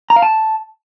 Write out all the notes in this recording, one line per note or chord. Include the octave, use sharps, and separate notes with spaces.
A#5
F5
A5